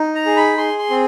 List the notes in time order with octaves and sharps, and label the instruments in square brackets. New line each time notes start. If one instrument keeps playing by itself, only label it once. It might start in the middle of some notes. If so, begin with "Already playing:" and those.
Already playing: [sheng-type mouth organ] D#4
A#5
G#4
B5
G#4 C6
C6
C4